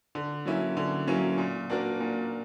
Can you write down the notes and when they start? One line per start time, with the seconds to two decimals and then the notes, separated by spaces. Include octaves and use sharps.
0.15 D3
0.46 F#3 A#3 C#4 E4
0.77 D3
1.07 F#3 A#3 C#4 E4
1.38 A#2
1.70 A#3 D4 F#4 A#4
2.00 A#2